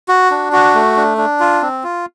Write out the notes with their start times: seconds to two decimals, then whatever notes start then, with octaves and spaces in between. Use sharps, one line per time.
0.08 F#4
0.31 D4
0.53 F#4
0.75 A3
0.96 D4
1.18 D4
1.40 F4
1.62 C4
1.84 F4